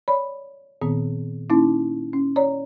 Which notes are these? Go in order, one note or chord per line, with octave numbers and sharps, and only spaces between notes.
C#5 D5 B5
A#2 D#3 B3 C4
A#3 C#4 D#4 E4
C#4
C#5 D5 A#5